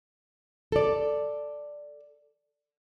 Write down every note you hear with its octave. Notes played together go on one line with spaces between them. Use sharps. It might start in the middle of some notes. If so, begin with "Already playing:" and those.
A4 D5